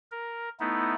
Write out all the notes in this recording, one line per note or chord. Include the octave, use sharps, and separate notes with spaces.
A#4
A3 B3 D#4 E4